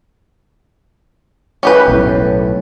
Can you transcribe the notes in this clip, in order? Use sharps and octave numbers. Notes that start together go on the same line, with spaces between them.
C#4 G4 B4
B1 A2